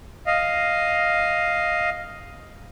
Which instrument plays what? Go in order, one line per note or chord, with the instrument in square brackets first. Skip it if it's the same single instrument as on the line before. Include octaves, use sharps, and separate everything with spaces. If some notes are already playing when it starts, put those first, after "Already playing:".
[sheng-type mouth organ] D#5 F5